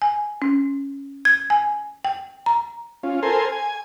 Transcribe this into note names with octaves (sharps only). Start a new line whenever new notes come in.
G#5
C#4
G#6
G#5
G5
A#5
C#4 F4
A4 A#4 C5 G#5 C6
G#5